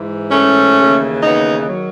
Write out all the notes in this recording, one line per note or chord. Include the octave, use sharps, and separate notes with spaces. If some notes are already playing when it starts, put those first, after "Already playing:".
Already playing: G#2 E3
A3 C#4
D#2 C#3 E3
B3 D#4
D#3 F#3